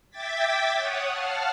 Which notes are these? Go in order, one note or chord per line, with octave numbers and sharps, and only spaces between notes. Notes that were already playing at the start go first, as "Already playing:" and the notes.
E5 G5 D6 G#6 A6 B6
C#5 F#5 D#6
F5 F#5 A5 F6